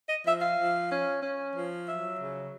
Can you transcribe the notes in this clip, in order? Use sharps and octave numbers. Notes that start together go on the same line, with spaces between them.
D#5
F3 E5
F5
F3
C#4
C#4
F3
F#3 E5
C#3